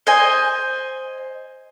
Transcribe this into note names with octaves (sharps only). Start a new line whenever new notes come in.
C5 D#5 G#5